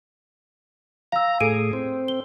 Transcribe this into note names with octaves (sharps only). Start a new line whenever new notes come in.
F5 A#5 E6
A2 G#4 A4 D7 D#7
C4
G7